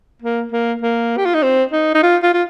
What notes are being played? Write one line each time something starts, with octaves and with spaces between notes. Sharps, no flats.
A#3
A#3
A#3
G4
F4
D#4
C4
D#4
D#4
F4
F4
F4